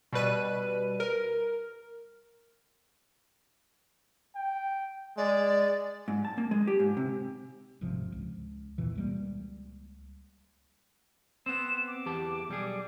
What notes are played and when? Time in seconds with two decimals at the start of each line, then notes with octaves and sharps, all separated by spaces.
0.13 B2 G3 B4 D#7
1.00 A#4
4.35 G5
5.17 G#3 D5
6.08 G#2
6.25 A5
6.38 A#3
6.51 G#3
6.67 G4
6.80 G#2
6.97 C3
7.81 D#1 G#1 C3 F3
8.12 C#2
8.78 E2 A#2 E3
8.95 C#2 G3 A#3
11.46 B3 C4 E7
11.87 D6
12.06 E2 G4 A5
12.49 B1 G3 G#4